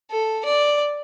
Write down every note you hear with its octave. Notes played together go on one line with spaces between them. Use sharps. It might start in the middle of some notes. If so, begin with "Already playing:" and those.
A4
D5